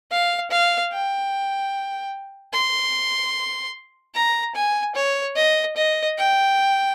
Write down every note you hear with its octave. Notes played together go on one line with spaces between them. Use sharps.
F5
F5
G5
C6
A#5
G#5
C#5
D#5
D#5
G5